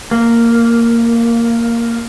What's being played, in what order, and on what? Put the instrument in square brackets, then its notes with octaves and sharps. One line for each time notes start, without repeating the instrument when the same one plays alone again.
[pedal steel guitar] A#3